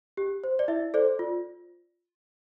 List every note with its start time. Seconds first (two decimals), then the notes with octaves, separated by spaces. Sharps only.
0.17 G4
0.44 C5
0.59 D5
0.68 E4 E5
0.94 A4 C5 D5
1.19 F4